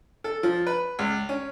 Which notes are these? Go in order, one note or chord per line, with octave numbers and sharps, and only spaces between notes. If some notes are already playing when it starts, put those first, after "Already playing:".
A4
F3
B4
C#2
C#4